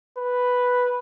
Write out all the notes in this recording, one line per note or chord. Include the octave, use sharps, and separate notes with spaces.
B4